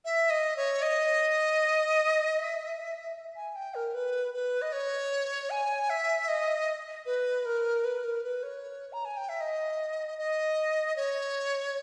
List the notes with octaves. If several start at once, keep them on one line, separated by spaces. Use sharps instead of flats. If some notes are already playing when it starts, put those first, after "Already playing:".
E5
D#5
C#5
D#5
E5
G#5
G5
A#4
B4
B4
D#5
C#5
G#5
E5
D#5
B4
A#4
B4
A#4
B4
C#5
A#5
G#5
G5
E5
D#5
D#5
C#5